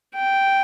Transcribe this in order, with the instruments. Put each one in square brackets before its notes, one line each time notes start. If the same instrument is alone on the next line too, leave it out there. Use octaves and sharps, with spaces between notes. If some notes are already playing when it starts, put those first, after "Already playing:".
[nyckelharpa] G5